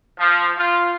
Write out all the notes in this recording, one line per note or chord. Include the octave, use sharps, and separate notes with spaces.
F3
F4